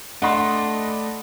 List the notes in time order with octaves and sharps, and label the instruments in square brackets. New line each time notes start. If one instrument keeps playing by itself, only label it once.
[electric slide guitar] A3 [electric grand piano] D4 D#5 B5 [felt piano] F#5 C6